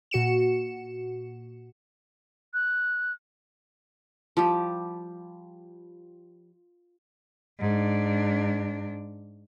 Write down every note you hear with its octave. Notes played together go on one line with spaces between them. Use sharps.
A#2 F#4 C#7 E7
F#6
F3 G3 G4
G#2 D4